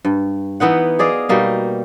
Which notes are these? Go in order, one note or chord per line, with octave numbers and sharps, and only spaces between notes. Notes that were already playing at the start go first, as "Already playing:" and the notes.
G2
E3 B3 D#4 F#5
G#4 D5 D#5 F5
B2 G3 A#3 D#4